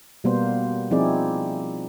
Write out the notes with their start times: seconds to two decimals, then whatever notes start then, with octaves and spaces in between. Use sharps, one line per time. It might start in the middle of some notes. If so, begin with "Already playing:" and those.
0.24 B2 G3 A#3 B3 C5
0.91 F3 C4 D#4 E4 G#4 D5